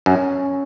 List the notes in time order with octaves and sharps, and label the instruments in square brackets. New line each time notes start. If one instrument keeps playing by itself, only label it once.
[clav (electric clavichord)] F#2 [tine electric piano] C#4